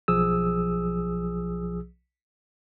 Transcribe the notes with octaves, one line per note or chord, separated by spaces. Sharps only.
B1 F3 G#4 D#6 E6